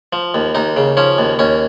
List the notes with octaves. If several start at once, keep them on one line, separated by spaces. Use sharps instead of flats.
F3
D#2
D#2 D#4
C#3
F3 C#4
D#2
D#2 C#4